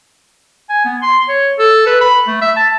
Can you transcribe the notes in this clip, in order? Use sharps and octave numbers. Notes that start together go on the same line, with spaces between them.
G#5
B3
C6
C#5
A4
B4
B5
A3
E5
A5